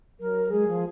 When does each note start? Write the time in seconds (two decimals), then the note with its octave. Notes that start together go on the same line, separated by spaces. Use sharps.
0.20 F#3 A#4
0.51 G#3 G#4
0.68 F3